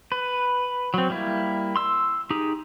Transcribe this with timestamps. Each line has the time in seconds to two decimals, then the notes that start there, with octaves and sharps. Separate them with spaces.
0.12 B4
0.94 F#3 C4
1.10 G3 A#3 E4
1.76 C6 E6
2.30 D#4 G4 G#4